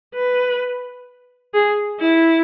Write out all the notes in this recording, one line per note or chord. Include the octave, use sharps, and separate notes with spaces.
B4
G#4
E4